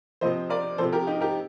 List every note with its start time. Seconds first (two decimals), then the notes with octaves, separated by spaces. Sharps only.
0.21 C3 F3 C5 D#5
0.50 A#4 D5
0.78 C3 F3 A4 C5
0.92 G4 A#4
1.07 D#4 G4
1.21 G4 A#4